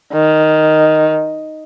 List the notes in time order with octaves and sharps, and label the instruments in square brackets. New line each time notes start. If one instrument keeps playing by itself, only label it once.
[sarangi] D#3